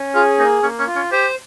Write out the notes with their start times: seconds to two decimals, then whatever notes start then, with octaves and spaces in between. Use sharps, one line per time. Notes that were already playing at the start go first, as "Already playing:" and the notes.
Already playing: C#4
0.15 F4 G#4
0.39 A#3 D#4
0.63 A#3 C#4
0.79 C#4
0.87 F4
0.96 C#4
1.12 G4 C5